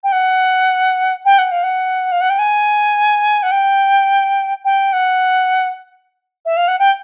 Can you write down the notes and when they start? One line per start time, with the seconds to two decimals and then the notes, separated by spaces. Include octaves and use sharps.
0.04 G5
0.12 F#5
1.25 G5
1.38 F#5
1.51 F5
1.63 F#5
2.12 F5
2.21 F#5
2.30 G5
2.39 G#5
3.43 F#5
3.51 G5
4.65 G5
4.93 F#5
6.45 E5
6.57 F5
6.68 F#5
6.79 G5